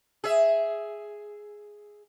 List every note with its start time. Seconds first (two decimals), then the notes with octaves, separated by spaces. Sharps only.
0.24 G#4 E5